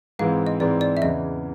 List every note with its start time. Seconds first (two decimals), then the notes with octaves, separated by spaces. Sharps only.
0.19 G#2 E3 G#3 C4 F5
0.47 D#5
0.60 G#2 E3 G#3 C4 D5
0.81 D5
0.97 E5
1.02 E2 C#3 E3 D#5